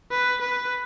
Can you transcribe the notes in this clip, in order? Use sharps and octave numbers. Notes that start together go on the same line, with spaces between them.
B4
B4